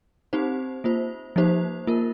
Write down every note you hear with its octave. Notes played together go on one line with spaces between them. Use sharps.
C4 D#4 G4 C5
A#3 F4 C5
F3 A#3 D#4 G4 C5
A#3 F4 A#4